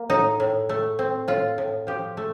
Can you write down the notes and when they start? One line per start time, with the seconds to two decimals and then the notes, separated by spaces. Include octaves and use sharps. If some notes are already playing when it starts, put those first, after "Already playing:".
Already playing: A#3
0.10 A2 D#4
0.40 A2
0.69 A3
0.99 C4
1.28 A2 F4
1.58 A2
1.87 F3 G4
2.17 A3